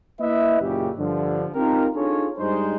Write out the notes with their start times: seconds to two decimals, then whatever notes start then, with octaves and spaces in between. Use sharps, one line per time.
0.20 A#3 E4 B4 D#5 E5
0.61 F#1 A#2 C#3 G4
0.97 G2 D3 F3
1.55 C4 D#4 F4 G4 A#4
1.95 D4 D#4 F4 G#4 A4 C#5
2.38 G2 G3 G#3 D#4 C5